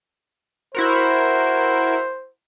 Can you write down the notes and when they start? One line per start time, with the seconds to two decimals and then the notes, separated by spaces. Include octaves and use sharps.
0.75 E4 F#4 A#4 C5